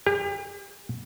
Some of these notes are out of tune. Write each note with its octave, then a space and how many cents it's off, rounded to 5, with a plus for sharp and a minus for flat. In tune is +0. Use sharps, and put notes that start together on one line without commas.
G4 +40